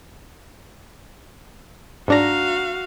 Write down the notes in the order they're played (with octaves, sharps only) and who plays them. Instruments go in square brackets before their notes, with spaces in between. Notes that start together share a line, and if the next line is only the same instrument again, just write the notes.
[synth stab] G#2 D4 A#5 [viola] F#4 F5